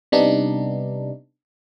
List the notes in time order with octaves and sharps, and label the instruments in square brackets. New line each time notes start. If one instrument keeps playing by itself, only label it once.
[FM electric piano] C3 G3 B3 D4 D#4